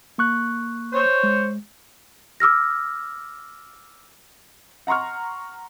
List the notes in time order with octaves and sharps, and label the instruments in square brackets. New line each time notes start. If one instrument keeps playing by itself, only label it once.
[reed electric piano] A#3 C#6 F#6
[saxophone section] C5 C#5
[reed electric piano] G#3
[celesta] D6 E6 F6 A#6
[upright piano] F#5 A#5 C6 C#6 F6